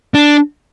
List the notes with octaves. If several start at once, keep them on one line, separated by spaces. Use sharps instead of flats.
D4